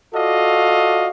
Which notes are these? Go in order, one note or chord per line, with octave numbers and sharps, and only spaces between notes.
F4 F#4 A4 D5 D#5 F5